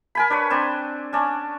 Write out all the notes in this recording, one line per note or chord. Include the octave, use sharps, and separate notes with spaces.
A#4 G#5 B5
D4 B4 C#5
C4 D4
C#4 D4